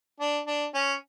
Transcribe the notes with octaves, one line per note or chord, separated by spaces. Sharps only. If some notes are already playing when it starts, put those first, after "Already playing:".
D4
D4
C#4